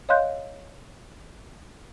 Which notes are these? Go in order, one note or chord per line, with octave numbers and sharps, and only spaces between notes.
C#5 D#5 F5 C6 F#6 G6